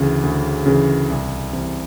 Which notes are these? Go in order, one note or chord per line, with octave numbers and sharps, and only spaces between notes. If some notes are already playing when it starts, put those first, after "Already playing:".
Already playing: D2 C#3 E3
D2
C#3 E3
C2
C3 E3